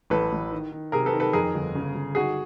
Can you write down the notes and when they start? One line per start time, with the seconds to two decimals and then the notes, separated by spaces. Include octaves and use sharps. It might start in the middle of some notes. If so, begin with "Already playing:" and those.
0.10 A1 A4 B4
0.32 A1
0.52 D#3
0.72 D#3
0.92 C3 G#4 A#4
1.06 A4 B4
1.13 D#3
1.20 A4 B4
1.33 F2 G#4 A#4
1.55 G1
1.75 C#3
1.95 G1
2.15 D#4 F#4 G#4